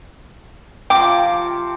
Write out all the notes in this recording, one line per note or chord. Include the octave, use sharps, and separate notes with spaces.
C3 F3 G5 D6